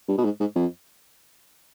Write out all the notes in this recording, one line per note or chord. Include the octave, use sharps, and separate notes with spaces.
G2
B2
G#2
G#2
F2